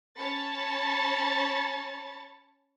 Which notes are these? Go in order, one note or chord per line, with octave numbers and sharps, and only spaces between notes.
C#4 C#5 A5 B5 A6 C#7